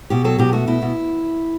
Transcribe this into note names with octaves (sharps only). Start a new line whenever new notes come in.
B2 G4
F#3 A4
B2 G4
A3 F#4
B2 E4
B2